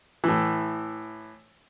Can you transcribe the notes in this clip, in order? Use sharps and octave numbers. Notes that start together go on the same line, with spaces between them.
A2 E3